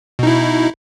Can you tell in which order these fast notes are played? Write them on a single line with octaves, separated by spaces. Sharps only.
B2 D#4 E4